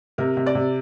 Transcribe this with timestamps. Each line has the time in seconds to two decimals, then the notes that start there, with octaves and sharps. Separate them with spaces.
0.18 C3 A#4
0.37 C3
0.46 D5
0.55 C3